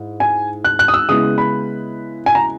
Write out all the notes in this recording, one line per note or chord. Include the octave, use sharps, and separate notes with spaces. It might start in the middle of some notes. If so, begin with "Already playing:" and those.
Already playing: G#2 E4
G#5
F#6
F#6
D#6
E6
C#3 G#3 B3 E4 D#6
B5
G#5
A#5